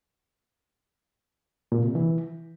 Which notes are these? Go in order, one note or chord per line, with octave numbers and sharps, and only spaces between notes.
A#2
C3
E3